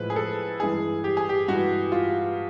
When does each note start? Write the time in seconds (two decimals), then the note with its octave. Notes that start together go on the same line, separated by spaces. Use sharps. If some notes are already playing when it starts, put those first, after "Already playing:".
Already playing: A2 F3 G#3 B4
0.10 G#4
0.16 A4
0.60 G2 E3 G#3 G#4
1.04 G4
1.17 G#4
1.29 G4
1.48 G2 E3 G#3 F#4
1.92 F4